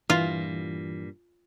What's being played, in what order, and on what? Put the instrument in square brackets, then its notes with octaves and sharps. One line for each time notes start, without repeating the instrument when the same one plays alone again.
[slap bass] G2 A#2 [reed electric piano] E3 [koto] F4